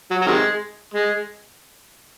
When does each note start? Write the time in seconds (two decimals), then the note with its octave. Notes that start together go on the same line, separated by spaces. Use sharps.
0.11 F#3
0.21 F#3
0.26 C3 D#3 G#3
0.94 G#3